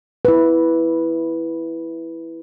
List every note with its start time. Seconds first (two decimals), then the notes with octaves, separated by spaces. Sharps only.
0.25 E4 B4